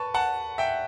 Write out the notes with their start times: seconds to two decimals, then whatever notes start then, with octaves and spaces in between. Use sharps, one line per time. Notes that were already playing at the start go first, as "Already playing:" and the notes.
Already playing: B4 A5 C#6
0.14 F#5 A5
0.58 E5 G5